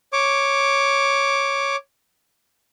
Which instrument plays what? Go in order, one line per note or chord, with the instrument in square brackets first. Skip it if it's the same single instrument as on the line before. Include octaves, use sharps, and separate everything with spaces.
[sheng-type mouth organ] C#5 D6